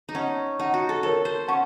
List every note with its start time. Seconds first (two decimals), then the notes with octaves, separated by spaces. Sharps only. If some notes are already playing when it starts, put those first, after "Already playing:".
0.09 D#4
0.15 C#4 D#5 F#5 A5
0.59 D#4 D#5 F#5 A5
0.74 F#4
0.89 A4
1.03 A4 A#4 C#5 A5
1.25 C5
1.48 C#4 F#5 A5 C#6